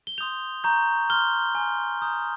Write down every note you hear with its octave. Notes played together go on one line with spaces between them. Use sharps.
G7
C6 D#6 G6 F7
A#5 C#6 G6
C6 F6 G7
G#5 C6 F6
A#5 D#6 G6